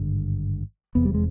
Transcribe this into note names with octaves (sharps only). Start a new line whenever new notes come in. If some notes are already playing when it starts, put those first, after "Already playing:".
Already playing: G#1 G2 D3
F1 E2 C3 B3
G3
G#3